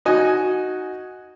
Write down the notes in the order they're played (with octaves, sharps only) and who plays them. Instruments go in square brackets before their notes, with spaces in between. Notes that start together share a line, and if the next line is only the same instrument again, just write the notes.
[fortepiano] D#4 F#4 D#5 F#5 G#5